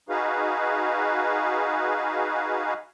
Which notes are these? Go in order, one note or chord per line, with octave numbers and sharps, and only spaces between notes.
D#4 F#4 G#4 B4 F5